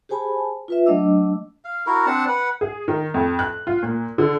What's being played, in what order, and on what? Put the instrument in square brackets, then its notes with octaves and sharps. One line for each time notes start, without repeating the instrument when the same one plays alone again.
[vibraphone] G4 G#4 C5 G#5 A5 B5
F4 B4 E5
F#3 A3 D4 D#5 D6 E6
[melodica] F5
E4 F#4 A#4
C4 D4 F#5 A5
B4 F#5
[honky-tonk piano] G#4
D#3
F2
F#6
F4
A#2
D3